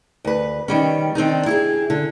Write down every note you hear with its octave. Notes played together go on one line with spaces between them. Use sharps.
D2 B4
D#3 G3 C#4
D#3 C4 D4 D#4
E4 G4 G#4
D3